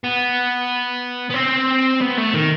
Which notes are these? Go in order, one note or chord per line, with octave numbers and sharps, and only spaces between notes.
B3
B3
C4
B3
A3
D#3